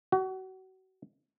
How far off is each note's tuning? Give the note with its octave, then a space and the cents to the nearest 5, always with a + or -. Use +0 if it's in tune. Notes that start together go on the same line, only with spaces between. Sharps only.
F#4 +30